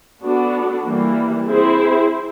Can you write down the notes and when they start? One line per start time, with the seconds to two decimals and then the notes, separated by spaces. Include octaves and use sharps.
0.22 B3 D4 F#4 A4
0.84 E3 G3 A#3
1.47 C4 E4 G#4 C5